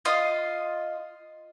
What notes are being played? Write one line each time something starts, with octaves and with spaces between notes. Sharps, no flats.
F4 D#5 F5